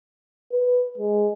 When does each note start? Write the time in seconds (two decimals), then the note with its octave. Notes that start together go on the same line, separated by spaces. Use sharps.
0.52 B4
0.98 G#3